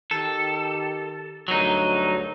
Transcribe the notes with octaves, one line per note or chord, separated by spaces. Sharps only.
D#3 G4 A4
D2 G2 F#3 D#4 A#4